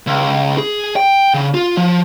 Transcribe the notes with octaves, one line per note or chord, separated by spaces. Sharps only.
C#2
G#4
G5
C#3
F4
F3